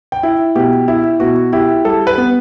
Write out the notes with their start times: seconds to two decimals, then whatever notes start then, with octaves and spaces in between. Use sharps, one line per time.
0.12 G5
0.23 E4
0.55 B2 G4
0.88 E4
1.20 B2 F#4
1.53 E4 G4
1.85 G3 A4
2.07 B4
2.18 B3